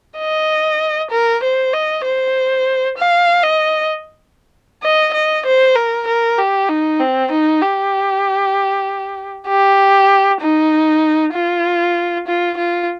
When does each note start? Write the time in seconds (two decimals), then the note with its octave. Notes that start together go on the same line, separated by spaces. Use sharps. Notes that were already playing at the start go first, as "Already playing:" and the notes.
0.18 D#5
1.11 A#4
1.43 C5
1.73 D#5
2.05 C5
2.98 F5
3.43 D#5
4.83 D#5
5.14 D#5
5.46 C5
5.76 A#4
6.07 A#4
6.38 G4
6.69 D#4
7.00 C4
7.31 D#4
7.62 G4
9.48 G4
10.41 D#4
11.34 F4
12.27 F4
12.57 F4